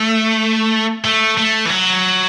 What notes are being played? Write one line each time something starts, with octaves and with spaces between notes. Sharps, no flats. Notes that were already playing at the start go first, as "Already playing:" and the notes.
Already playing: A3
A3
A3
E3
F#3